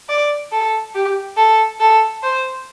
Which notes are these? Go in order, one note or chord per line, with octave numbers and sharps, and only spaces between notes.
D5
A4
G4
A4
A4
C5